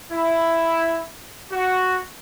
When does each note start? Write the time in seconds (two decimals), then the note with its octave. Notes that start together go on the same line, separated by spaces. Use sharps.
0.12 E4
1.52 F#4